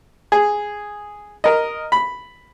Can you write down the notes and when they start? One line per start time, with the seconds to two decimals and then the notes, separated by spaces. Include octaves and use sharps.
0.32 G#4
1.44 A#4 D#5
1.92 B5